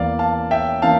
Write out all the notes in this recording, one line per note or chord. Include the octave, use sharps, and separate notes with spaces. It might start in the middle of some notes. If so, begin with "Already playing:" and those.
Already playing: E2 E3 A#3 D5 F5
F5 A5
E5 G5
E3 A#3 F5 A5